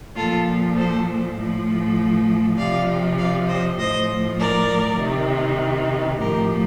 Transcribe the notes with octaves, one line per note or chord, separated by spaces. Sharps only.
A#2 F3 F4 A4
A4 C5
A2 F3
C3 F3 D5 F5
D5 F5
C5 D#5
A2 F3 C5 D#5
A#4 D5
C3 D#3
A2 F3 G4 A#4